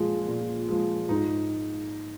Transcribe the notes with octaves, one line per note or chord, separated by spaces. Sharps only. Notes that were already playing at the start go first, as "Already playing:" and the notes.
Already playing: A#2 F3 G#3
A#2
F3 G#3
G#2 D#4